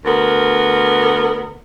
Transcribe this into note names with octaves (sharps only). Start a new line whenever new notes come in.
D2 B3 A#4